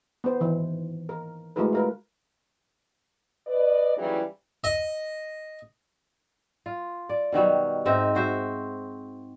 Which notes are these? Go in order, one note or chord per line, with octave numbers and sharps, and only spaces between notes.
B3 C5
D#3 E3
A#4
G#3 A3 E4 F#4 A#4 B4
F4 A#4 B4
B4 D5 D#5
D#2 C#3 E3 F#3 G3 E4
D#5
F4
D5
B2 D#3 F#3 G3
G#2 C4 D#4 E5
F#4 C5 E5